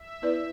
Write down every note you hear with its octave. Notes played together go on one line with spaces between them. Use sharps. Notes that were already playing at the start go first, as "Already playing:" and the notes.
Already playing: E5
B3 E4 B4 D5